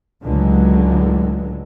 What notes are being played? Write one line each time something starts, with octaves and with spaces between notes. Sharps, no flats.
C#2 A2 D3 F#3 G#3